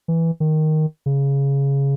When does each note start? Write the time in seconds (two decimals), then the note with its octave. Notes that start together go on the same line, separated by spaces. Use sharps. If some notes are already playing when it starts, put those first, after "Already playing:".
0.08 E3
0.40 D#3
1.06 C#3